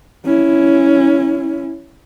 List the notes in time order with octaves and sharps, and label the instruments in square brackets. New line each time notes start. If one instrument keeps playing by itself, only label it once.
[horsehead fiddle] C#4 E4